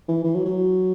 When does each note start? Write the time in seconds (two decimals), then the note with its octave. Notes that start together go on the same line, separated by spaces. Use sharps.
0.08 E3
0.24 E3
0.34 F#3
0.45 F#3